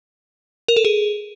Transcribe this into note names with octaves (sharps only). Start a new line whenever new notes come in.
A#4
A4
G#4